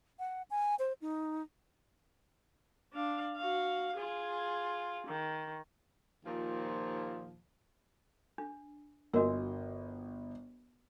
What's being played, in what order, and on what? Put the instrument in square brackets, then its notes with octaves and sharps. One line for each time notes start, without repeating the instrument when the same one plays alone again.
[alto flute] F#5
G#5
C5
D#4
[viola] D4 F5
F#4 F5
F4 G#4
D#3
[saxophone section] D#2 A#2 F3
[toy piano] D4
[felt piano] G1 D#5 [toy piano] D4 F#4 A#4